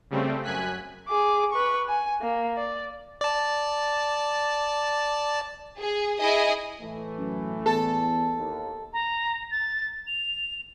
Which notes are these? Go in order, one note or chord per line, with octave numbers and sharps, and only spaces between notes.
C#3 G3 A3 C4
F#2 G#5 F#6 B6
G#4 D6
B4 C#6
G#5
A#3
D5
D5 A5
G#4
E4 G#4 D#5 G#5 D#6
A2 E3 A3
F#2
E2 A4
D#2
A#5
A6
F7